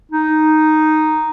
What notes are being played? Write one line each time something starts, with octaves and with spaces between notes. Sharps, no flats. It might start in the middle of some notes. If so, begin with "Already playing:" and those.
D#4